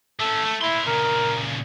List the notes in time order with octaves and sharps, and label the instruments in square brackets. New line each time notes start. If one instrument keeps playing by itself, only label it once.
[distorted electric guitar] A3 C#4 [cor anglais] A4
[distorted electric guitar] A3
[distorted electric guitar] A#3 C6 [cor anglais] E4
[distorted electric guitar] A#2 C#3 [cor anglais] A#4